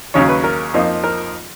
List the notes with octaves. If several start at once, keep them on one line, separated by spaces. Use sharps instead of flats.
D#2 C#3 F#3 C#4 C#5
B4
A#4
F2 F3 A#3 D#4
A#4